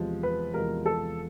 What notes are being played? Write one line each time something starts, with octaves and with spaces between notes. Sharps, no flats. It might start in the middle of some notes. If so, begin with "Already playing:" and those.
Already playing: E2 C3 F3 G#3
B4
E2 C3 F3 G#3 A#4
A4